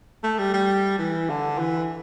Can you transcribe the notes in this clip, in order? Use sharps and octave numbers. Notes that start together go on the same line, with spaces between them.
A3
G3
G3
E3
D3
E3